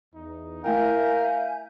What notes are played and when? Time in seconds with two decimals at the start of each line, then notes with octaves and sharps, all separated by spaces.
0.14 E2 D#4
0.64 A3 E4 A#4 E5 F5 G5 G#5 G6